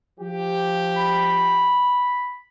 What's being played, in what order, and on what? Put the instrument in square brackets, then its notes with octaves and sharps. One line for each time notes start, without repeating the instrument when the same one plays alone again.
[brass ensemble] F3 G4
[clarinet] B5